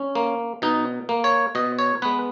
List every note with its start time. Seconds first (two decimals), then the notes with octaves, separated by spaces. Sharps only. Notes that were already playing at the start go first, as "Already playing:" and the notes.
Already playing: C#4
0.15 A#3
0.62 B2 D#4
1.09 A#3
1.24 C#5
1.55 B2 D#5
1.79 C#5
2.02 G#3 B3 B4